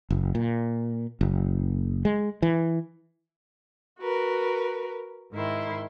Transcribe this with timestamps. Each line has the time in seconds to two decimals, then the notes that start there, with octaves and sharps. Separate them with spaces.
0.10 F#1
0.35 A#2
1.21 F#1
2.05 G#3
2.42 E3
4.01 F#4 A#4 B4
5.33 G#2 D#3 E4 C6